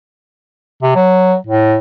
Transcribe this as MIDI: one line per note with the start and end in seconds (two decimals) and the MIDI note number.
0.83 0.94 48
0.95 1.35 54
1.47 1.77 45